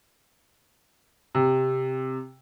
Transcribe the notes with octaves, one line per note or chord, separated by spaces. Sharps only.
C3